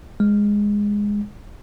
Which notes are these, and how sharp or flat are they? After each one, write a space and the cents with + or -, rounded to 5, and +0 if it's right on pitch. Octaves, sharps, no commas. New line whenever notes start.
G#3 -10